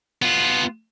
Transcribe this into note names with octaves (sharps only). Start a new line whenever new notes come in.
B3 F4